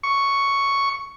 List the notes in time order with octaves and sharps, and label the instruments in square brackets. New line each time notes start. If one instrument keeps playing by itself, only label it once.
[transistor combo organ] C#6